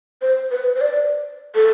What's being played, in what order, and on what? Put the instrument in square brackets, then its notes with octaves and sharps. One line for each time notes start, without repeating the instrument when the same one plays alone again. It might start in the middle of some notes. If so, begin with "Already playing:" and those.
[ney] C5
B4
C5
D5
A4